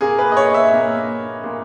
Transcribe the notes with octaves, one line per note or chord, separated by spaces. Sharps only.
A#2 A#3 G#4
B4
D#5
C#5
E5
A#2 A#3
A#2 A#3